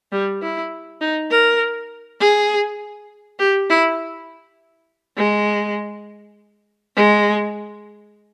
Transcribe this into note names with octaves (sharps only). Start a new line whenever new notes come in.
G3
E4
D#4
A#4
G#4
G4
E4
G#3
G#3